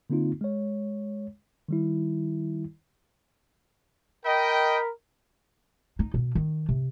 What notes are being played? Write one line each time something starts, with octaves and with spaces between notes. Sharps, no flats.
D3 A#3 C4 D#4 F4
G#3 C#5
D#3 G3 E4
A#4 D#5 G5 B5
D#4
B2
D#3
C3